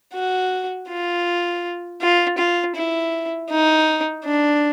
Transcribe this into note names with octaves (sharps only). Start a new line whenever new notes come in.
F#4
F4
F4
F4
E4
D#4
D4